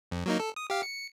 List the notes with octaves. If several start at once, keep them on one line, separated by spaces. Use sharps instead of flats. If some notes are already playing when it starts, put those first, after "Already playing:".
F2
F#3 A#3 D#4
A4
D#6
G4 F5
C#7